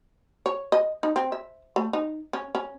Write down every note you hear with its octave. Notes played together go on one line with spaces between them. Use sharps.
C#5
D#5
D#4
C4
E5
A3
D#4
C#4
C#4